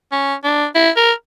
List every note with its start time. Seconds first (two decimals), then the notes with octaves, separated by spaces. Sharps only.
0.12 C#4
0.44 D4
0.75 E4
0.97 A#4